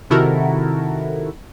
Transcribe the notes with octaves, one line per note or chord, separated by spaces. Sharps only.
C3 D#3 E4 F#4 A4 A#4